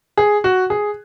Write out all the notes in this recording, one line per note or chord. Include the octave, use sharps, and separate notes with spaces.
G#4
F#4
G#4